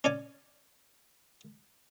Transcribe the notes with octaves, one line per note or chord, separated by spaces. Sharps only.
C#4 D5 G#5